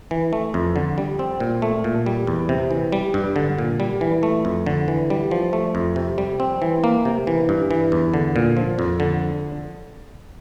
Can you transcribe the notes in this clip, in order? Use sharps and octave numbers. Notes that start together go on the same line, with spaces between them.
E3
A3
F2
D3
G3
C4
A#2
A3
A#2
G3
E2
C3
E3
G3
G2
D3
A#2
G3
E3
A3
F2
D3
E3
G3
F3
A3
F2
C3
G3
C4
E3
A#3
C3
E3
G2
E3
E2
D3
A#2
F3
F2
D3